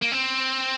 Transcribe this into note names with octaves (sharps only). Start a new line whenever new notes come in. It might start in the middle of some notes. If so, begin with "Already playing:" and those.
A#3
C4